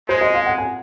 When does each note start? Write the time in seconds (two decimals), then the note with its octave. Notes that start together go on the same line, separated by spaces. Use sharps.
0.08 G#3 C5
0.21 D#5
0.34 F5
0.46 F#5
0.58 G#5